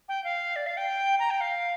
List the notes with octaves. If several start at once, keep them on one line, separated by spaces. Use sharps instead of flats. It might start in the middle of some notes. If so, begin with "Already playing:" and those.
G5
F5
D5
F5
G5
A#5
G5
F5